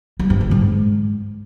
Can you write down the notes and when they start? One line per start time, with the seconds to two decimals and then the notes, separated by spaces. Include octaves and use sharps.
0.19 G3
0.30 G2
0.41 D3
0.51 G#2